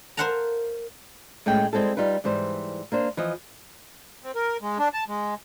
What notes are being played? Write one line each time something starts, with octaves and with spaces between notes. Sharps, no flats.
A#4 C5 F5 F#5 A5 A#5
A2 G#3 A3 C#4 G5
G3 G#3 C4 E4 A4
G3 D#4 F4 B4
G#2 E3 G3 C5
A#3 D4 C5
E3 F3 D#5
C4
A#4
G#3
D4
A5
G#3